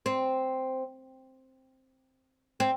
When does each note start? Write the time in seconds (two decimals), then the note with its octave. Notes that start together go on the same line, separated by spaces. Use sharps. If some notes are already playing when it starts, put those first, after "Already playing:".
0.06 C4
2.60 C4